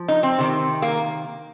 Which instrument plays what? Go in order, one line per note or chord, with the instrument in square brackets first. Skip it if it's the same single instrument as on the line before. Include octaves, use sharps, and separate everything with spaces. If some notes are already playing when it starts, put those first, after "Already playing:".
Already playing: [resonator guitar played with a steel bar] F3
D#4
C4
C3 D#3
A#3